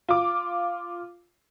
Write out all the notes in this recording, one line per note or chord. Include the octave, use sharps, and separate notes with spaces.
F4 D6